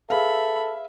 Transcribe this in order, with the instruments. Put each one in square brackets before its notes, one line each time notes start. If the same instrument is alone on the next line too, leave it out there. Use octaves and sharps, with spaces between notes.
[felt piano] G#4 B4 F5 [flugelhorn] A4 [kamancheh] E5 [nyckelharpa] B5